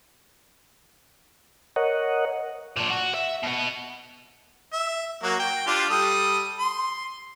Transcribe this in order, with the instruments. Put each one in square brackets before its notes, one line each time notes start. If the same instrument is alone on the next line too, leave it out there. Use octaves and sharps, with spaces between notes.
[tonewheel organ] A#4 C#5 D#5 F#5
[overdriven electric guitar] A#2 D4
F#4
E5
B2 B3
[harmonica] E5
F#3 A#3 F#4
G5
D4 F4 G4
G3 A4 D#6
C6